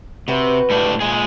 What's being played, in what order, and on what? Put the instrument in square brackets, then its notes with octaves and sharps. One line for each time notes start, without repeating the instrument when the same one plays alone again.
[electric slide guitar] C3 [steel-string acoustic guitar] F#4 B4
[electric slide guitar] A2 G3 D4
A#2 G#3 G#4